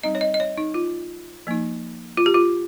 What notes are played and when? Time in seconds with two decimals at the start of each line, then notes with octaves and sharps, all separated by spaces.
0.03 G3 C4 D#4 D#5
0.15 C#5
0.21 D#5
0.34 D#5
0.40 C#5
0.58 D#4
0.74 F4
1.47 F3 A#3 D#4
2.17 F4
2.26 G4
2.34 F4